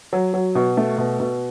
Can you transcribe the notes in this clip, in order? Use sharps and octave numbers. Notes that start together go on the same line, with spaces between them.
F#3
F#3
B2
A3
B2
B2